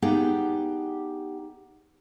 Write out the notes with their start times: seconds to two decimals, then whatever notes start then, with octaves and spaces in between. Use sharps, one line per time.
0.02 B3 D#4 G4 G#4 F5 F#5